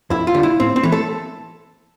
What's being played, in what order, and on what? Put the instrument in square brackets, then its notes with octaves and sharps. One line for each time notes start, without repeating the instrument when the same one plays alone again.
[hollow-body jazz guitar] F2 E4
F4
D3 G3
E4
A2 C4
C4
E3 A3
A4